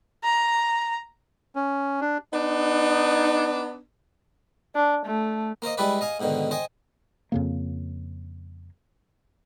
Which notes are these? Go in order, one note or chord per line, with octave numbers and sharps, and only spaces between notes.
A#5
C#4
D4
B3 D4 D#4
D4
A3
A#3 A#4 C5 D#5
G3 G#3 E4 G4 B4 D5
D#5 F5 G#5
G#2 B2 D3 D#3
C5 D#5 G5 G#5
F2 C#3 A#3